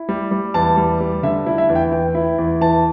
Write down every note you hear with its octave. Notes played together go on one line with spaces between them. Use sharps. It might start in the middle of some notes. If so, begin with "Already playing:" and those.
Already playing: E4
G3
G3
E2 A5
G3
G3
D3 E5
E4
E5
E2
G5
E3 G5
E4
E2
E3 A5